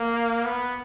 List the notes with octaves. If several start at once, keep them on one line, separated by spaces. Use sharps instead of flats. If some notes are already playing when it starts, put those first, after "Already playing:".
Already playing: A#3
B3